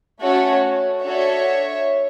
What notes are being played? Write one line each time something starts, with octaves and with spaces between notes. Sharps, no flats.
A3 C#4 F#4 A4 C#5
D4 F#4 A4 C#5 E5